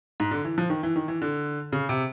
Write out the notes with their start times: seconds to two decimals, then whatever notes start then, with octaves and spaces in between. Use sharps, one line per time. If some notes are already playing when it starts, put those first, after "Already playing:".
0.20 G#2
0.31 D3
0.45 E3
0.58 F3
0.70 D#3
0.83 E3
0.96 D#3
1.08 E3
1.22 D3
1.72 C#3
1.89 C3